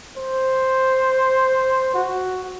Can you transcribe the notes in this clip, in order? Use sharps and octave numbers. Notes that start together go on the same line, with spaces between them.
C5
F#4